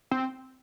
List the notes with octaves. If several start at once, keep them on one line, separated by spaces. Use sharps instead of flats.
C4